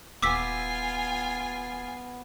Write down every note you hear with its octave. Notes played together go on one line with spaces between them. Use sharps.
D#1 B3 F4 G#5 D6 E6 B6